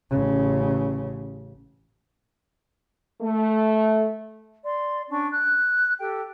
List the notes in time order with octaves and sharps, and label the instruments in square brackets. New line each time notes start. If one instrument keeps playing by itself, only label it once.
[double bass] A1 C#3
[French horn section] A3
[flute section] D5 C6
C#4 D4 C#6
F#6
G4 A4 G5